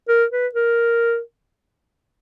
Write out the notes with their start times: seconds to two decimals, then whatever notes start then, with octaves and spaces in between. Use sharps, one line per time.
0.08 A#4
0.31 B4
0.55 A#4